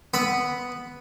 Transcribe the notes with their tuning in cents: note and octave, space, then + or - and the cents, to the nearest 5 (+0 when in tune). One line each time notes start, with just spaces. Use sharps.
B3 +0 B5 +0